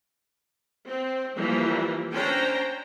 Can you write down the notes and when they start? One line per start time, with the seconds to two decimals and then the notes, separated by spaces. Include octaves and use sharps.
0.87 C4
1.36 E3 F3 G3 A#3
2.12 C#4 D4 C5 G5 A#5